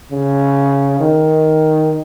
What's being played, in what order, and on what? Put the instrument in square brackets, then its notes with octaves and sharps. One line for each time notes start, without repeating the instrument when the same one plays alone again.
[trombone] C#3
D#3